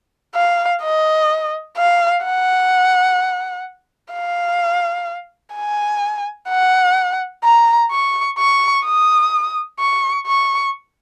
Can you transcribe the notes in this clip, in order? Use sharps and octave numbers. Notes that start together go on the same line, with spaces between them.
F5
D#5
F5
F#5
F5
G#5
F#5
A#5
C#6
C#6
D#6
C#6
C#6